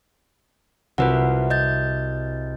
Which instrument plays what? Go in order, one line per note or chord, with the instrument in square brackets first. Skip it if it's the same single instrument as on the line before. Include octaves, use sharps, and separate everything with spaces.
[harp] C2 F#4 E5 [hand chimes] F4 B4 F#5
[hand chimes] D#5 G6 A6